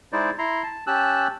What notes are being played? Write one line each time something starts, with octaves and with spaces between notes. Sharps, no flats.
G#3 D#4 E4 C5 D5
E4 A#5 C6
A5
C#4 G4 A5 E6 F#6